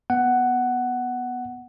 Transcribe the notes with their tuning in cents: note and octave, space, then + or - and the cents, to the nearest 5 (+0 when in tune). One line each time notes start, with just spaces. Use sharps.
B3 +0 F#5 +10